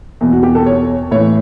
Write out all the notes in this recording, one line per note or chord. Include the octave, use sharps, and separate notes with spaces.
E2 B2
F#4
G4
A4
C#5
A2 E3 C#5